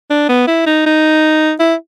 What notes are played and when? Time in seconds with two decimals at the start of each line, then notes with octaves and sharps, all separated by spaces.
0.10 D4
0.29 B3
0.47 E4
0.66 D#4
0.86 D#4
1.60 E4